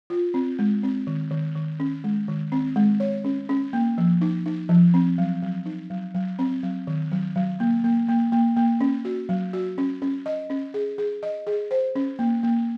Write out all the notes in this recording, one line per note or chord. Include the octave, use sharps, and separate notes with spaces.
F4
C4
G#3
C4
D#3
D#3
D#3
C#4
G#3
D#3
C4
G#3
C#5
C#4
C#4
A#3
F3
D#4
D#4
F3
C4
F#3
F#3
D#4
F#3
F#3
C4
F#3
D#3
F#3
F#3
A#3
A#3
A#3
A#3
A#3
C#4
F#4
F#3
F#4
C#4
C#4
D#5
C#4
G#4
G#4
D#5
G#4
C5
C#4
A#3
A#3